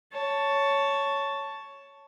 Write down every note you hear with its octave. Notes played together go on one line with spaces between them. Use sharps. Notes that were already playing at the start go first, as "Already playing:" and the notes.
C#5 A5